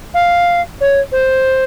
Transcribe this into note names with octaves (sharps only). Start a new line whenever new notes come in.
F5
C#5
C5